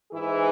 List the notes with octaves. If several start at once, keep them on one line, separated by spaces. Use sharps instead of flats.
G#2 E3 E4 G#4